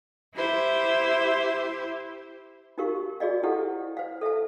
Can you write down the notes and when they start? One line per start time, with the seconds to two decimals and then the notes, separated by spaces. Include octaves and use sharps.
0.35 E4 G4 C5 E5
2.78 D#4 F#4 G4 A#4 F5 C#6
3.20 F#4 G#4 D5 D#5 F5
3.43 E4 G4 A4 C5 F5 F#5
3.97 C5 F5
4.21 A4 E5 F5 A5